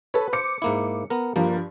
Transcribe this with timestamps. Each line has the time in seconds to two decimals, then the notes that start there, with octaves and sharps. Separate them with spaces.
0.14 A4 B4 C#5
0.33 C5 D6 C#7
0.62 G#2 A#3 E4
1.10 B3 A#4
1.36 G2 F3 A#3